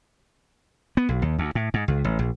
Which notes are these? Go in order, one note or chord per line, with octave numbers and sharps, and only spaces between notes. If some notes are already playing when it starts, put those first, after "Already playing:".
B3
B1
D#2
D2
A2
G#2
C#2
A1
A#1